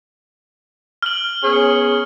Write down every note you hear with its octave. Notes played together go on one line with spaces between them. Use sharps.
F6 F#7
B3 C#4 G#4